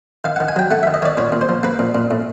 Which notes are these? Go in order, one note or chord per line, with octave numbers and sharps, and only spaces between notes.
D#3 F5
D#3 F#5
G#5
F#3 G5
A3 F#5
D#3 E5
D#5
D#3 C#5 D5
A#2 C#5
A#2
C5
F3
A#3 B4
A#2
A#2
A2